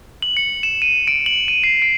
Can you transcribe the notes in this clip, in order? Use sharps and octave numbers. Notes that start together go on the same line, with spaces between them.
F#7
C#7
E7
D#7
D7
F#7
D#7
C7
D7